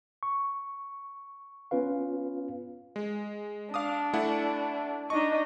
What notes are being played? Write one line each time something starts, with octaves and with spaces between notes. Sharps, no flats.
C#6
B3 C#4 F4 B4 F5
G#3
D4 F5 D6 D#6
A3 E4 F#5
D4 D#4 D#5 C#6